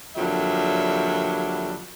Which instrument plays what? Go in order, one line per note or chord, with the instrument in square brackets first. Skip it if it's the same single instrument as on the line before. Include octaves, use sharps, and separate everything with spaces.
[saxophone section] F2 D3 F#3 G3 A#3 E5